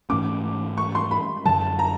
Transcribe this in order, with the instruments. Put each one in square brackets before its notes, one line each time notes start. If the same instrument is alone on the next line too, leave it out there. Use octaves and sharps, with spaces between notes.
[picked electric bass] G#2 E3 A3 C#4 [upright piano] D6
[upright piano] C#6
C6
B5
[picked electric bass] F#2 D3 F#3 [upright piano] A5
[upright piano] A#5